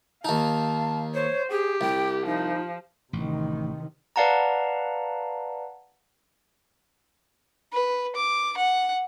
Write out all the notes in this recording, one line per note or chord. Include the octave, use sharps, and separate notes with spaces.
D#2 D#4 F5 A5
C5 C#5
G4 G#4
C2 G5
F3 D#4
A1 C3 D#3
B4 D5 F5 F#5 A5 A#5
B4
D6
F#5